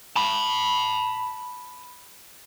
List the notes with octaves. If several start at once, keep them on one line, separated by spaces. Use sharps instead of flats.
A5 B5